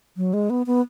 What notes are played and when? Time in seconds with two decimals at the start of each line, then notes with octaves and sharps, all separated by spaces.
0.17 F#3
0.33 G#3
0.50 B3
0.67 B3